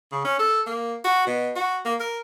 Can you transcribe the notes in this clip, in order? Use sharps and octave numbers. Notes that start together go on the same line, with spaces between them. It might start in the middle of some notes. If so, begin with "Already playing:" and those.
C#3
C#4
A4
A#3
F#4
B2
F#4
A#3
A#4